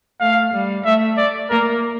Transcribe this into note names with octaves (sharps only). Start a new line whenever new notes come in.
A3 F5
G3
A3 E5
D5
A#3 A#4